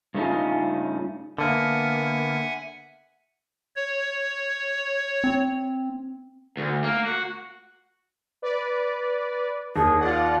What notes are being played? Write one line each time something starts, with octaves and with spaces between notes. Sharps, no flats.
G2 C#3 A3 C#4 D#4 F4
D3 A#3 B3 E5 F#5 G#5
C#5
C4
D2
A#3
F#4
B4 D5
D#2 G#4
F4 D5 F#5